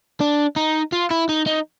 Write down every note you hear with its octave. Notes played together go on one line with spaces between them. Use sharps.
D4
D#4
F4
E4
D#4
D#4